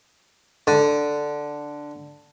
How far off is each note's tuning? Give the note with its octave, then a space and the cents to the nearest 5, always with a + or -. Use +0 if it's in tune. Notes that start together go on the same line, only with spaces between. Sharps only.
D3 +0